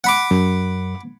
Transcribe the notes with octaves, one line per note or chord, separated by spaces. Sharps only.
F#5 B5 D6
F#2